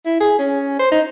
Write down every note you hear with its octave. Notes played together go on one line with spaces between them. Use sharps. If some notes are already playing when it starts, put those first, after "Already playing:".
E4
G#4
C#4
C5
D#4